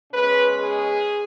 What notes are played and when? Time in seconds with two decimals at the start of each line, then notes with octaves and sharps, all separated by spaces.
0.12 B2 G#3 C#4 B4
0.60 G#4